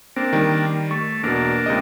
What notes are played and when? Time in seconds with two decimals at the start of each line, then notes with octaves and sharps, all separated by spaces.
0.16 A#3 C4 D4
0.33 D#3 G3
0.91 A3 C#6
1.23 E2 B2 A#3 D4
1.66 C#2 C3 D#5